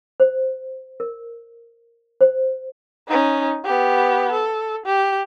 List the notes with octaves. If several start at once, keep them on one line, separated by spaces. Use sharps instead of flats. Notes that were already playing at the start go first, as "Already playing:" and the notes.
C5
A#4
C5
C#4 D#4
B3 G4
A4
G4